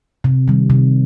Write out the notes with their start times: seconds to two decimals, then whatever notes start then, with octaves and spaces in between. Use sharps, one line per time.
0.24 C3
0.48 D#3 G3
0.70 C3